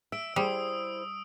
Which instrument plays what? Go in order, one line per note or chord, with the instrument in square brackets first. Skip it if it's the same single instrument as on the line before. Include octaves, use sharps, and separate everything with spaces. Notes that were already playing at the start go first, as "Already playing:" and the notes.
[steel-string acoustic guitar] E5 [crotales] E6 D7
[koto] G3 [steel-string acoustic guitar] E4 G#4 C5 [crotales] D#6